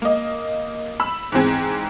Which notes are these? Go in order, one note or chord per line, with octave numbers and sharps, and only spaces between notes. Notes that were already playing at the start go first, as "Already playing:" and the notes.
A#3 D#5
B5 E6
G#2 E3 C4 G#4